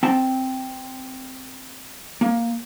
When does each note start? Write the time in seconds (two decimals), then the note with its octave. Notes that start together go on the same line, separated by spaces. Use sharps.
0.03 C4 G5 A5
2.21 A#3